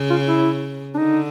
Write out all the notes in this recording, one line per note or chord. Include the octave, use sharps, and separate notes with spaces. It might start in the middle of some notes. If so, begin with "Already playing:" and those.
Already playing: C#3
F4
E4
D4
D3 D#4